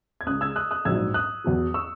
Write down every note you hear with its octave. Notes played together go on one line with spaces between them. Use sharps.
G#6
C#2 C#3 G#3 D#6 F#6
E6 G#6
D#6 F#6
D#6 F#6
A#1 G#2 F#3 E6 G#6
D#6 F#6
E2 B2 F#3
C#6 E6